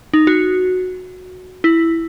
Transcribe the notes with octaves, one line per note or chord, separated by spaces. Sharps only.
D#4
F#4
E4